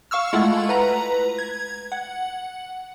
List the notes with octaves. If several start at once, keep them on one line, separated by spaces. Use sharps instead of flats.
F5 C#6 E6 F6
G#3 A3 E4 F4 F#5
B4 A#5
G#6
F#5